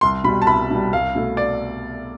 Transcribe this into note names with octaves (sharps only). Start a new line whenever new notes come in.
C2 C6
B2 G3 B5
A5
C2 B5
B2 G3
C2 F5
B2 A3
D5